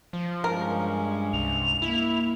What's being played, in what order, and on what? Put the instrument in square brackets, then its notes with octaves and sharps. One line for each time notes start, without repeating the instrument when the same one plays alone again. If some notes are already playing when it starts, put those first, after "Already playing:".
[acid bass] F3
[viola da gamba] G2 G#3 C#4 [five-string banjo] A#4
[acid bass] C2 [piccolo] F7
[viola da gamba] A#3 [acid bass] E4